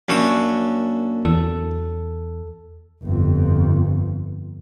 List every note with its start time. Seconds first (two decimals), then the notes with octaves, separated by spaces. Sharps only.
0.08 F#2 A#3 C#4 D4 C#5 E5
1.25 E2 A4
3.03 G1 F2